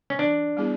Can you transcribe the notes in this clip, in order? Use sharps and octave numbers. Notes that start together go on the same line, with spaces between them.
C#4
E3 D4
G3 B3 E4 G#4